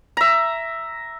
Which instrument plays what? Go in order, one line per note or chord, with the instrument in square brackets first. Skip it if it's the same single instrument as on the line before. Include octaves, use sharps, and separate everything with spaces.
[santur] E5 A#5